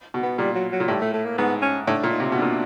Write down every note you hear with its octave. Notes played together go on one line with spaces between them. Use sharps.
B2
B3
A#2 G3
F#3
F#3
A#2
A2 G3
A3
A3
A#3
G#2 B3
C#4
A2 D4
A#2
D#4
C3
B2 D4
A#2